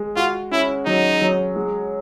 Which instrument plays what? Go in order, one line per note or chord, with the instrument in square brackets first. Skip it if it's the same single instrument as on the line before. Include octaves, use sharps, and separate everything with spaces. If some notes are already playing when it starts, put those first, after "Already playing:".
Already playing: [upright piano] G#3
[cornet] F4 [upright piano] F#4
[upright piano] C#4 [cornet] E4
[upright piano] F#3 [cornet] D#4
[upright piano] F#3
G#3